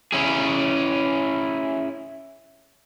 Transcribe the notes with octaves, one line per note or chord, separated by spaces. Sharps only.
C#4 E4 G#4